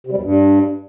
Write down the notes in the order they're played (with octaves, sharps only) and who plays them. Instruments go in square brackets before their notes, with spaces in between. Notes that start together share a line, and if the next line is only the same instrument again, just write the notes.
[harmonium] C3
G3
E2
G2